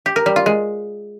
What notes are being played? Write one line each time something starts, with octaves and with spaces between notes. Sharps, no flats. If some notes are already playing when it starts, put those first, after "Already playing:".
G4
A#4
G3
F4
G#3